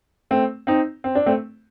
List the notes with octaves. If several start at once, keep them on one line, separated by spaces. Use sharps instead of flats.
A3 C4
C4 D#4
C4
D4
A3 C4